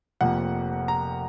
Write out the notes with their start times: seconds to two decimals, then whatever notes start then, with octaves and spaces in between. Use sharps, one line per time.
0.21 F1 F2 F3 A#3 F#5
0.88 A#5